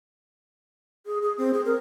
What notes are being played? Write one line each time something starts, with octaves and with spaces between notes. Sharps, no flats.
G#4
G#4
C4
G#4
A#4